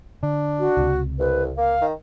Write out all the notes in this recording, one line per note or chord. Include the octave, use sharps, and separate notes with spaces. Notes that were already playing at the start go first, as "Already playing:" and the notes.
D3 D4
F#4
C#2 C3
C2 B4
A#3 F5
D#3